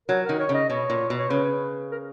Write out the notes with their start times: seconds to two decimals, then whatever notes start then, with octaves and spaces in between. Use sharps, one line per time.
0.08 F#3 A#4
0.24 D#3 A#4
0.39 C#5
0.49 C#3
0.54 D#5
0.69 B2 C#5
0.90 A#2
1.10 B2
1.18 C#5
1.30 C#3 B4
1.92 A#4